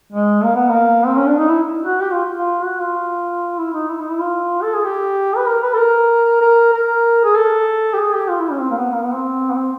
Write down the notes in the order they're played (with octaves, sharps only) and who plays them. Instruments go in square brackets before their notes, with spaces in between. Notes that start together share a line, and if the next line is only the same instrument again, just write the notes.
[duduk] G#3
A#3
B3
A#3
C4
C#4
D4
D#4
E4
F#4
G4
F4
F4
F#4
F4
E4
D#4
E4
D#4
E4
F4
A4
G#4
G4
B4
A#4
B4
A4
A#4
A#4
A#4
G#4
A4
G4
G#4
G4
F4
E4
C#4
C4
A#3
B3
A#3
B3
C4
B3
C4